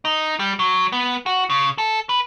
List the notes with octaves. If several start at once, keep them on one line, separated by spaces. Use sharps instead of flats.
D#4
G3
F#3
B3
F#4
C#3
A4
B4